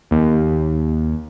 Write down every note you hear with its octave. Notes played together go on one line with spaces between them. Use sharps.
D#2